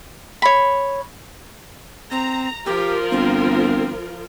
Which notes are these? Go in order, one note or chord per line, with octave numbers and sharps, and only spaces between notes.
C#5 B5
C4 A#5
F3 F4 G4 A#4
G1 C4